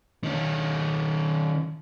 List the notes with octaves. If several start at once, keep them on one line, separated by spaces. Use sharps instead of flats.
D#3 C#4